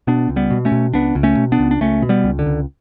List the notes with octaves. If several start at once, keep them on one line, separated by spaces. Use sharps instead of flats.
B2 B3 D4
C#2
G3 B3
B2
A3 C#4
B2
C#2 B3 D4
C#2
A3 C#4
B2
B3 D4
C#2
D4
C#2 A3 C#4
B2
G3 B3
C#2
D3
C#2